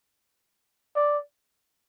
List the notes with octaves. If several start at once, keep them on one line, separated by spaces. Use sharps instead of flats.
D5